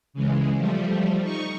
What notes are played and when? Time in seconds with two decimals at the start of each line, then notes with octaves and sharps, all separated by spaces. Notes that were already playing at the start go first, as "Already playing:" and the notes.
0.13 C#3 E3 G#3
0.56 F3 G3 A3
1.22 D#4 C#6